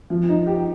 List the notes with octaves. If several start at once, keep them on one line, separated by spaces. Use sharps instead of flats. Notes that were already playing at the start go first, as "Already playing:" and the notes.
F3
D#4
G4